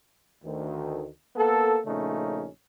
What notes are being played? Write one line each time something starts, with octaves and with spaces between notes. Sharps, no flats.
D2 D#3
A#3 B3 A4
A#1 C#3 A3 C#4 D#4